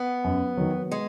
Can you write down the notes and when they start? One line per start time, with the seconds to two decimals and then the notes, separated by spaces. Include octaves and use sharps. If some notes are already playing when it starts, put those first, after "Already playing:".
Already playing: B3
0.24 F#2
0.57 D#3 F#3
0.91 G#3